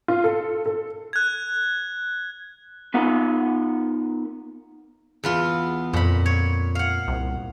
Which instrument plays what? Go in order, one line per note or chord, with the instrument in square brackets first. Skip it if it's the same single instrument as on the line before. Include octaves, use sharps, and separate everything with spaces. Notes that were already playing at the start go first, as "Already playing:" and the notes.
[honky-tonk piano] F4
A4
A4
[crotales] F#6 G#6
[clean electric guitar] B3 D#4 F4 A#4 F#5
[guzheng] E2 B3 F4
[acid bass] F2 [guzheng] A#2 B5
[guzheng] C#5
F5 F#5
[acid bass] C2